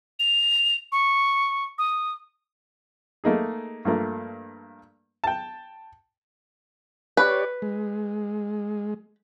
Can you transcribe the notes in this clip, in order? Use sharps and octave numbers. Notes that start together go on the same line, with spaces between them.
F7
C#6
D#6
A3 A#3 D#4 G#4
G2 F3 A3 A#3
G5 A5
G4 B4 C#5 D5
G#3